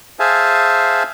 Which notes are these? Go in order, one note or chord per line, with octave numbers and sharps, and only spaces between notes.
G#4 C5 E5 F5 G#5 A5